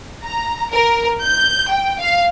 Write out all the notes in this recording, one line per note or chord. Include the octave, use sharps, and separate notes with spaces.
A#5
A#4
G6
G5
F5